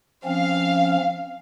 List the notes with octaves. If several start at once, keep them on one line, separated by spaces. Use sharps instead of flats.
F3 C4 C#4 F5